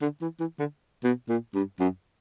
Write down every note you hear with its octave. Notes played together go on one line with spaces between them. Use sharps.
D3
E3
E3
D3
B2
A#2
G2
F#2